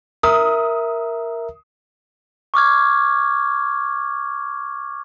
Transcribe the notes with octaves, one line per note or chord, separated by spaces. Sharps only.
A#4 E5 D#6
C#6 D6 F6 G#6